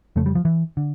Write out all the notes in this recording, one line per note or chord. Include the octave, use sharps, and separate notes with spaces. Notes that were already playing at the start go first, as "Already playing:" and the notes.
F2 C#3 A3
G3
F3
E3
D3